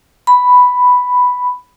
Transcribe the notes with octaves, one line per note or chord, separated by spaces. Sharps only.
B5